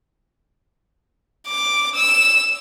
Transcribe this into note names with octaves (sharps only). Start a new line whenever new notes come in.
D6
E6